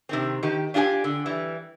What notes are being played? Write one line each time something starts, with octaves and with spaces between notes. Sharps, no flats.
C3 D#3 C4
D#3 G4
D4 F4 G4 D5 G#5
D3
E3 G3